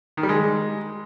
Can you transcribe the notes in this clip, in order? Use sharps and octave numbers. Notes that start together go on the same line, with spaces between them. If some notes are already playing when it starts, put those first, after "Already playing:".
D#3
G3
G#3